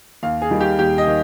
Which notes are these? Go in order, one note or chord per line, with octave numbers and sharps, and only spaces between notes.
D#2 F5
G#4
D#3 G3
G4
D#2 G4
D#5
D#3